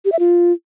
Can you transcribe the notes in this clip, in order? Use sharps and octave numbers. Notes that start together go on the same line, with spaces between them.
G4
E5
F4